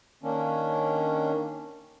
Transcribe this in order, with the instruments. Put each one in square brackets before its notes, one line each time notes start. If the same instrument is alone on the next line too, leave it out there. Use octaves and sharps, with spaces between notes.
[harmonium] D#3 A#3 C#4 D4